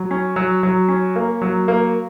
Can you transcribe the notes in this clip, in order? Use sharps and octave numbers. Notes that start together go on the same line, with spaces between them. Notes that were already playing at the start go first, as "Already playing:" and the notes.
Already playing: F#3
C#4
F#3
F#3
C#4
A#3
F#3
A#3